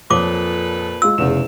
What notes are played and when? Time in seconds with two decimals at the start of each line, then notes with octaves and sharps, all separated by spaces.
0.11 F2 A#2 A4 B4 C#5 D6 D#6
1.02 G#3 F4 E6
1.18 F1 E2 C#3 E7